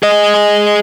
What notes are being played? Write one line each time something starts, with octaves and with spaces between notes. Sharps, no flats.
G#4 D#5